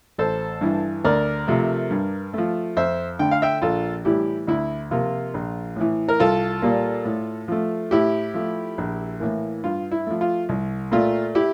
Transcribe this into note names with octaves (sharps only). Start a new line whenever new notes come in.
A1 A4 C5
G2 E3
D2 A#4 D5
C3 F3 A3
G2
F3 A3
F2 C5 E5
D3 A3 G5
F5
E5 G5
A#1 F4 A4
A2 E3 G3 E4 G4
D2 E4
C3 F3 A#3 F4
A#1
A2 E3
A#4
C2 F4 A4
A#2 G3 A#3
A2
F3 A3
A2 E4 G4
F3 A3
A#1
A2 E3 A#3
G2 F4
E4
F3 A3
F4
C2
A#2 A3 F4
E4 G4